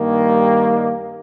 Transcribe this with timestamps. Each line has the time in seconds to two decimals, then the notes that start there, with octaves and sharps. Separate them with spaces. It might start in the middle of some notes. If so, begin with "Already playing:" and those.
Already playing: G2 D#3 G3 A#3
0.39 G4